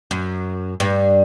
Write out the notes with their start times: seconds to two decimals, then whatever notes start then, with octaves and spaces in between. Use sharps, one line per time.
0.11 F#2
0.80 G2